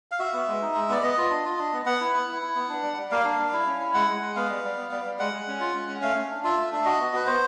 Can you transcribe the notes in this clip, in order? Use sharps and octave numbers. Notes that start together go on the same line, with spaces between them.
F5
F#4 E5
B3
G#3
D#4
G#3
B3 D5
B3 D#5
F4
D4
F4
D4
B3
B3 F#5
E4
B3
E4
E4
B3
D4
G3
G3
A#3 F5
D4
G3
E4
C#4
E4
G#3 F#5
G#3
G#3
B3 F5
G3
G3
B3
G3
G3
G#3 F#5
G#3
C#4
F4
G#3
C#4
A3 F5
A3
D4
F4 E5
A3
D4 E5
F#4 D#5
B3
F#4 B4
B3 C5